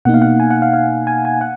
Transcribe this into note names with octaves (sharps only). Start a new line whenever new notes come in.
B2 A#3 D#4 F#5
F5
F#5
G#5
F#5
F5
F5
G#5
G#5
F#5